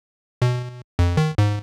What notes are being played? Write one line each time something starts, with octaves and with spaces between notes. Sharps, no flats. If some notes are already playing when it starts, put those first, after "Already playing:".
B2
F2
D#3
G#2